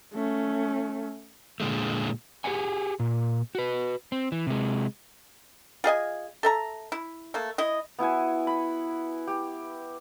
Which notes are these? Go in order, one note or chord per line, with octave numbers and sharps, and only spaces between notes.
A3 C#4
A#2 D3 G#3 A3
G4 G#4 C5 D#5 F#5 G#5
A#2
F#4 B4
C4
E3
C3 G#3
F4 G#4 D#5 G#5
A4 E5 A#5
E4
A3 A#3
E4 D#5
B3 E4 F#4 G#5
B5
G4